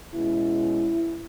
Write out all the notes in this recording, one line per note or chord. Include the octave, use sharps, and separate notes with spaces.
B2 G#3 C#4 E4